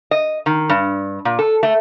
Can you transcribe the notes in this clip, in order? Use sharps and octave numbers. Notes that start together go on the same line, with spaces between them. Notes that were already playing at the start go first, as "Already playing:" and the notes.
D#5
D#3
G2
A#2
A4
A3